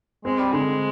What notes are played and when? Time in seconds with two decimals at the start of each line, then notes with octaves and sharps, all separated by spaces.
0.25 G#3 C4
0.39 G3
0.52 D3 G#3